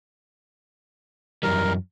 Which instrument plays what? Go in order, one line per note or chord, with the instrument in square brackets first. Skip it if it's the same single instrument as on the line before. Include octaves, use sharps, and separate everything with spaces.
[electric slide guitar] F#2 E3 G3 [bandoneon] A#4